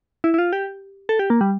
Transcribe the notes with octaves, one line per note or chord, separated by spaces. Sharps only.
E4
E4
F4
G4
A4
G4
A#3
G3